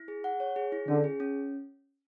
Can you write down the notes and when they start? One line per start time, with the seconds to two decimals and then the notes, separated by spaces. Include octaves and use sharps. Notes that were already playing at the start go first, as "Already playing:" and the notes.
Already playing: E4
0.08 G#4
0.24 F#5
0.40 C#5
0.56 G#4
0.72 E4
0.88 D3 C#4
1.04 G#4
1.20 C#4